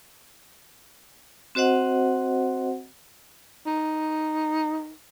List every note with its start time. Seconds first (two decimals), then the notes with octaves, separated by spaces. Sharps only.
1.55 C4 F#4 C5 D#5 F#5
3.66 D#4